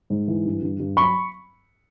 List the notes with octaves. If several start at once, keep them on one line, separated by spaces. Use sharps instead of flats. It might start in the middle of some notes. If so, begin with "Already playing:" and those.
G#2
E3
G2
G2
G2
F#3 B5 C#6